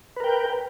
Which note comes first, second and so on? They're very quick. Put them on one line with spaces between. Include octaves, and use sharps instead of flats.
B4 A#4 G5